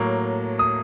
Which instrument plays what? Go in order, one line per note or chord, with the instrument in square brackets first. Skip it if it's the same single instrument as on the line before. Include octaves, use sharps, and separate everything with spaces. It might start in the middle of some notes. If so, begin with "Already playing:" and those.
Already playing: [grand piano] A2 F#3 A#3
D#6